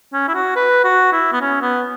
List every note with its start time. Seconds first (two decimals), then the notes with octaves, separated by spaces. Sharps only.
0.13 C#4
0.28 E4
0.34 F#4
0.56 B4
0.84 F#4
1.12 E4
1.33 B3
1.41 C#4
1.62 B3